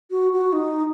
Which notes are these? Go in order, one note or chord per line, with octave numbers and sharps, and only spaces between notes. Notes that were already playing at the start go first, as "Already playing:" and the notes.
F#4
F#4
D#4